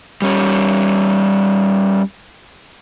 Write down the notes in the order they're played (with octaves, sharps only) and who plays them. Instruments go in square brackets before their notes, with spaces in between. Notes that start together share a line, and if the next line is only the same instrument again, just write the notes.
[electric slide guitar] G3 C#4